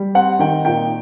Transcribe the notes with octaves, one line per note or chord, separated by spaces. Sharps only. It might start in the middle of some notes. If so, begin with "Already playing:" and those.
Already playing: G3
C4 F#5
D#3 G5
A#2 G5